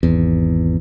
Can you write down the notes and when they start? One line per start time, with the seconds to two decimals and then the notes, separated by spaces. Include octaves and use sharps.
0.03 G#1 E2